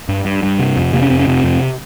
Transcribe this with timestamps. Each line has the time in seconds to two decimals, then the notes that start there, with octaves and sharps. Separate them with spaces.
0.09 G2
0.25 G2
0.43 G2
0.59 C3
0.76 F2
0.93 C3 A#3
1.02 C#4
1.10 F2 C4
1.19 C#4
1.27 C3 C4
1.44 F2